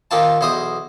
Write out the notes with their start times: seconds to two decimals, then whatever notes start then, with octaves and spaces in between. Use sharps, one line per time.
0.11 D#3 A#3 C4 F4 A5
0.41 B1 E2 C5 D#5 D#6